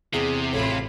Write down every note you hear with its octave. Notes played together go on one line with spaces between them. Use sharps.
E2 C3 G#4
A1 F4 A4 C#5 B5